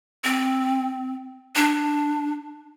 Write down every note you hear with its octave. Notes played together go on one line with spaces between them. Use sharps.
C4
D4